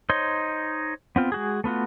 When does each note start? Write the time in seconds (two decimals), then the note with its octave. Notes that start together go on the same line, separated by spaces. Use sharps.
0.10 D#4 C5 C#5 D#5 C6
1.16 B3 C4 F4
1.32 G#3 F#4 G#4
1.64 A3 B3 F4 F#4